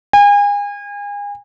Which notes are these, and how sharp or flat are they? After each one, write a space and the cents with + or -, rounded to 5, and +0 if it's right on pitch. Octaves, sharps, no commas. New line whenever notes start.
G#5 -35